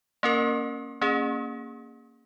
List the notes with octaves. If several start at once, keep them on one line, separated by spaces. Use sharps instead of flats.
A#3 C#4 A#4
A#3 C#4 G#4